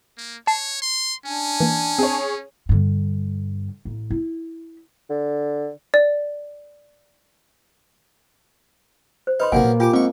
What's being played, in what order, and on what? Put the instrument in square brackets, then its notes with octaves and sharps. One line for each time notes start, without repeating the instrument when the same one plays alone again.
[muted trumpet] A#3
[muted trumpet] C#5 [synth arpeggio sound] A5 C7
[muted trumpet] C6
[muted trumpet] C#4 [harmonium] D4 G#5
[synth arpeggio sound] E3 A#3
[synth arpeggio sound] C4 [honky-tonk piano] G#4 C#5
[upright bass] G2 D3
A1
E4
[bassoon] D3
[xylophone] D5
[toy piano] C5
[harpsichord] D#4 [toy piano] B4 B5 C6
[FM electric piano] G#1 C3 [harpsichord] F3 F#3 B3 [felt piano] A#3 [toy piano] G#5
[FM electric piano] A#2
[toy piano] F4 G#5 [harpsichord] G4 D6
[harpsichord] G#2 C#6 [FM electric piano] C4 [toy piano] D6